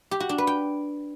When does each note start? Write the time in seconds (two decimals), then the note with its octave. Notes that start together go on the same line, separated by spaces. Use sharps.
0.11 G4
0.20 F#4
0.29 D4
0.38 B4
0.47 G5